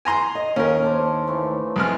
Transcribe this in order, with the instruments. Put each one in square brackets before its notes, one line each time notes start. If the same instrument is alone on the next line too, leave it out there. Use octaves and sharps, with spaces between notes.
[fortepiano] G#5 A#5 C6
[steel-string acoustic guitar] D#5
[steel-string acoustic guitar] D#2 [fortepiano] C#4 A#4
[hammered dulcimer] D4 A4 C5
C#3 E3 A3
[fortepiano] C2 G#3 F6